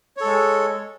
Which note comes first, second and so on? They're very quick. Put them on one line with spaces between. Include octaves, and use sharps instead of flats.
C#5 A4 G#3